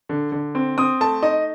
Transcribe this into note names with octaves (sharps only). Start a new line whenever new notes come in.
D3
D3
C4
C4 D#6
A3 A5
D#4 D#5